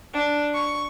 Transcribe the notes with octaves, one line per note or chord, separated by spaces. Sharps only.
D4
C#6